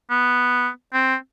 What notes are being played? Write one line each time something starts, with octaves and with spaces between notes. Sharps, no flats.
B3
C4